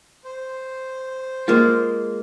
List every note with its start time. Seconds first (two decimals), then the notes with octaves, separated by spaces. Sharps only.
0.25 C5
1.48 G#3 A#3 F4